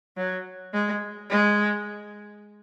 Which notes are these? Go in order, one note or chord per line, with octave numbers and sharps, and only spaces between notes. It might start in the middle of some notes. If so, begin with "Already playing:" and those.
F#3
G#3
G#3